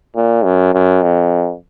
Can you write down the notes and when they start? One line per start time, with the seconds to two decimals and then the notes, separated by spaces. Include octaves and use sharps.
0.15 A#2
0.44 F#2
0.73 F#2
1.02 F2